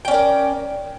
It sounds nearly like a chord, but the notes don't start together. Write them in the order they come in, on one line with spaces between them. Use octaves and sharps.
G5 C#4 D5 A#4